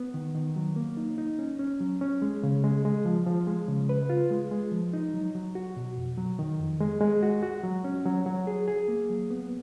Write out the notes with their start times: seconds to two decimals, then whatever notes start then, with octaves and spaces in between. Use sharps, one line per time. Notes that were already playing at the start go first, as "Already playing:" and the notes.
Already playing: B3
0.14 D#3
0.35 D#3
0.56 F#3
0.76 A#3
0.97 D#4
1.18 D#4
1.39 C#4
1.59 C#4
1.81 F#3
2.01 C#4
2.22 G#3
2.43 C#3
2.64 G#3
2.85 G#3
3.05 F3
3.26 F3
3.47 G#3
3.68 C#3
3.89 B4
4.10 F4
4.31 G#3
4.51 G#3
4.72 F3
4.93 D#4
5.14 F#3
5.35 F#3
5.55 F#4
5.76 B2
5.97 F2
6.18 F#3
6.39 D#3
6.60 F2
6.80 G#3
7.01 G#3
7.23 F#4
7.42 F#4
7.64 F#3
7.84 C#4
8.05 F#3
8.26 F#3
8.47 G#4
8.68 G#4
8.88 A#3
9.10 F#3
9.31 B3